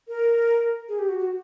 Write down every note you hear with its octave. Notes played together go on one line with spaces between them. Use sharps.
A#4
G#4
G4
F#4
F#4